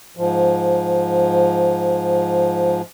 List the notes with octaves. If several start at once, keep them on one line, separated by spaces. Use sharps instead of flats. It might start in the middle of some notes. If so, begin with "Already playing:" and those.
G#2 F3